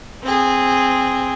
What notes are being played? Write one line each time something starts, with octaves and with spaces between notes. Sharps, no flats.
C4 G#4